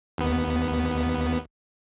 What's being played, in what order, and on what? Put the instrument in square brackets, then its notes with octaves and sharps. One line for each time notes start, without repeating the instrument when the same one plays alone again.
[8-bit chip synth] D#2 B3